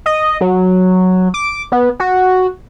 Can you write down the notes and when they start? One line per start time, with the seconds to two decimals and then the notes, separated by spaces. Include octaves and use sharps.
0.06 D#5
0.41 F#3
1.34 D6
1.72 B3
2.00 F#4